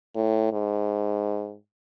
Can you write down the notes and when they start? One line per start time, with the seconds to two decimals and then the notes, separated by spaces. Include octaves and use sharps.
0.15 A2
0.52 G#2